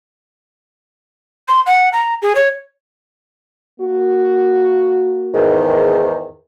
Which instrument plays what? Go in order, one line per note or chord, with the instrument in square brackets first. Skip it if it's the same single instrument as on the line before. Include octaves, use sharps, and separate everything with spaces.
[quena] C6
F#5
A#5
G#4
C#5
[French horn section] A#3 F#4
[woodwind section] E2 G#2 D#3